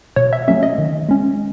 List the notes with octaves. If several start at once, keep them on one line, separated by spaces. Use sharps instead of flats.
B2 C#5
E5
F#3 A3 C#4 E5
D#5
D#3
G#3 C#4